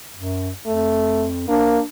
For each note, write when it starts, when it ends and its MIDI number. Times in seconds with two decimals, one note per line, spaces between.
0.16 0.51 42
0.66 1.48 41
0.66 1.26 57
1.48 1.79 58
1.48 1.85 62